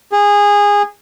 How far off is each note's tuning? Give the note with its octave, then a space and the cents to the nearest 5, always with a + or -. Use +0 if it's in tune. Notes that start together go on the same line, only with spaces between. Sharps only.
G#4 -20